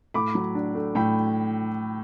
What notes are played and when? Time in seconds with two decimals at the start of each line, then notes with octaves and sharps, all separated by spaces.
0.14 A2 B5 D6
0.35 F#3
0.55 D4
0.75 A3
0.95 A2 G5 B5